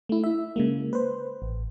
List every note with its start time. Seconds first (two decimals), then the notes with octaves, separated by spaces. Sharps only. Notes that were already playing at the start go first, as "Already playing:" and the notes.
0.09 A3 E4
0.24 E4 E5
0.56 C#3 G#3 A#3
0.93 B4 C5
1.42 A1